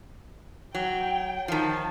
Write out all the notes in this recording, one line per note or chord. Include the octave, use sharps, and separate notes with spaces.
F#3 G5
D#3 F3 A5